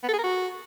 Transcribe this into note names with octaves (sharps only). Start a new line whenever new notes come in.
B3
A4
G#4
A#4
F#4